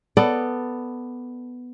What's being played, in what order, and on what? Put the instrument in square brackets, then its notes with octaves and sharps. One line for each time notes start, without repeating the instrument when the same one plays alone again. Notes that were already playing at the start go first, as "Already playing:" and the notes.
[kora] B3 A4 D5